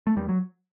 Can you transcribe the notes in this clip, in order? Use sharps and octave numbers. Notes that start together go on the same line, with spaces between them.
A3
E2 G3
F#3